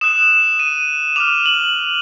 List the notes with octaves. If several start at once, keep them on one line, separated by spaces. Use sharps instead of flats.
D#6 F#6 E7
E7
D#7
D6 F6 F7
F#7